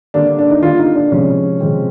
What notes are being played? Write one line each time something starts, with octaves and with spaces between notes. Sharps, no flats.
D3 G3 A#3 D4
D4
D#4
D3 G3 A#3 F4
D#4
D4
C3 F3 G#3 C4 C#4
C3 F3 G#3 C4